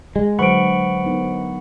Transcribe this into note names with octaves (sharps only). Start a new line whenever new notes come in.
G#3
D3 F#3 B4 C5 F#5 B5 C#6 D7
B3 D#4 A#4